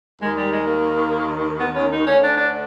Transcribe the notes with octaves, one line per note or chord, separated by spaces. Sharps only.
D#2 D#3 G#3
G3
G#3
A#3
B3
C#4
D#4
D2 D3 C#4
D4
D4